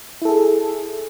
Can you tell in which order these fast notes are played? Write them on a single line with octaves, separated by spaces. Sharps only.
E4 A4 G#4